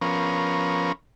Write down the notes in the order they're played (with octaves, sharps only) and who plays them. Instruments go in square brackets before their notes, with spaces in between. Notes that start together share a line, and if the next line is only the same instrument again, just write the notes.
[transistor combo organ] F3 B3 C#4 A#4